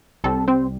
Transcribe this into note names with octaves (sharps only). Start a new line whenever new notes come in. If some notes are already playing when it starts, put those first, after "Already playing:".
C2 C3 G3 C4 A4
C4 C5